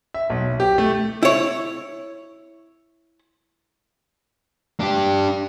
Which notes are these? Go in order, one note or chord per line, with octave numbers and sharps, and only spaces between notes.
E5
B1
G4
A3
E4 C#5
D4 G4